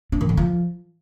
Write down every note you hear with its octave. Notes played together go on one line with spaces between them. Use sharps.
D4
D#3
D3
F3